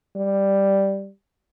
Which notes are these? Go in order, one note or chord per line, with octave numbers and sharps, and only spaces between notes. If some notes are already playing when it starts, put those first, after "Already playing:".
G3